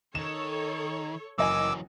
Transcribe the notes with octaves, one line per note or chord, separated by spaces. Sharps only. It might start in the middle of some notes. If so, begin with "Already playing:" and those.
D#3 A4 C#5 E7
F#1 E3 F#3 D#5 G#5 D6 E6